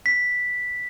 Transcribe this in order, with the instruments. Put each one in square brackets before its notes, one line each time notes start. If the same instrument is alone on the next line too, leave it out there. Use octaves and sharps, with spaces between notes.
[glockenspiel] B6